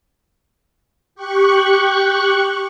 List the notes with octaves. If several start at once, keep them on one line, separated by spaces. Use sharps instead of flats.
G4 C#6 F#6